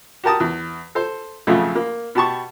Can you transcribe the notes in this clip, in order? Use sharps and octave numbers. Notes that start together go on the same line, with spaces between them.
F#4 G4 A#4 A5 D#6
E2
A4 C5
B1 F2 C#3 A3
A#3
B2 G4 A5 C#6